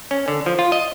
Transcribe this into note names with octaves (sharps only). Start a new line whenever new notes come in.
C#4
D3
F3
F4
D#5